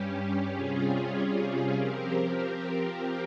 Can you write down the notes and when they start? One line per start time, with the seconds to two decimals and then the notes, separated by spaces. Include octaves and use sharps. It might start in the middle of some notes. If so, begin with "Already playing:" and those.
Already playing: G2 G3 C#4 G4
0.52 C3 G3 C#4 F4 G#4
1.75 F3 C4 G4 A#4